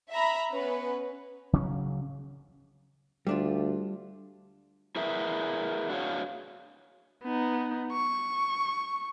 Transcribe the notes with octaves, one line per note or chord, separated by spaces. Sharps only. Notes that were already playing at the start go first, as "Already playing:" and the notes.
E5 A#5 B5
B3 C#4 B4
C#3 F#3 C#4
D2 G3 D4 F4
E4 G#4 A#4 B4 E5
D4 F#4 G#4 C#5 F5
B3 D#4
C#6